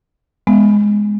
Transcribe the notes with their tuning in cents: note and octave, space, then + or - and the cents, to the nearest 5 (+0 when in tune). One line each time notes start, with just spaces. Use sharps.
G#3 +0 B3 +0